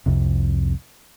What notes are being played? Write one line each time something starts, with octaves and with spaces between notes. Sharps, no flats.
C2 F2 C3